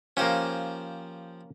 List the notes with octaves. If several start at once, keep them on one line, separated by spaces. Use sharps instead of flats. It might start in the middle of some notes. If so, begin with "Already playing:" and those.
F3 A#3 C#4 G4 C5